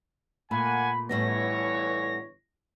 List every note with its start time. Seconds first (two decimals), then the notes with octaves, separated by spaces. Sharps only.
0.51 A#2 A3 A#3 F#5 G#5 B5
1.09 G1 A2 E3 G3 B3 C#5 A#6